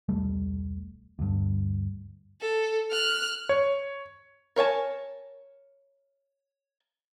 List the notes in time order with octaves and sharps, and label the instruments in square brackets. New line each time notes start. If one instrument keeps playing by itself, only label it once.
[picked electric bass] E1 C2 G3 A3
D2 G2
[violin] A4
F6 F#6
[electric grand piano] C#5
[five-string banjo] A#4 C#5 G#5 A5